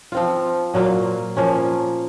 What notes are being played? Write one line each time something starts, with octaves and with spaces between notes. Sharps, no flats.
F3 C4 F4
A#2 F#3 A#3 F4
F3 A#3 C#4